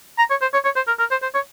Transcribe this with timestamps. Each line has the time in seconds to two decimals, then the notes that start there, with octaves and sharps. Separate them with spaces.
0.18 A#5
0.30 C#5
0.41 C5
0.53 C#5
0.65 C#5
0.76 C5
0.87 A#4
0.99 A#4
1.11 C5
1.22 C5
1.35 C#5